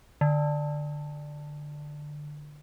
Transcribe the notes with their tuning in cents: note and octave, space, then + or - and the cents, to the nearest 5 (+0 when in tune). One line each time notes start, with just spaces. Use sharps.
D3 +10